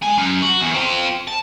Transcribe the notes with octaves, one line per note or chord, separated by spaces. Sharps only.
G#3 G#5
F#2
F#4
E2
C4 F4
A5